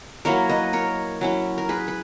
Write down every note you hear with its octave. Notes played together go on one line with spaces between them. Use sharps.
F#3 A#3 E4 A#4 C#5
B4 D#5
A#4 C#5
F#3 C#4 E4
A#4
G#4 B4
B4